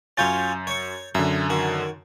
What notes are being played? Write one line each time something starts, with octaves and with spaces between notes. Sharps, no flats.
F#2 C#4 F4 C#5 G6 A6
C#5 C#6
F#2 D3 E5
D#3 F#4